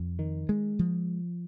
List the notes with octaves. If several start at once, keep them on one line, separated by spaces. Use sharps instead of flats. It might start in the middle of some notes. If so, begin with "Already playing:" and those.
Already playing: F2
D#3
G#3
F3